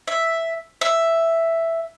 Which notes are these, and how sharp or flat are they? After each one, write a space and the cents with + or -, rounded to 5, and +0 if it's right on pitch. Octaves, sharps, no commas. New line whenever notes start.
E5 +0
E5 +5